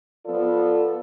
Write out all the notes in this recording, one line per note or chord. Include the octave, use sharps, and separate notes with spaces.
F3 B3 F4 A4 D5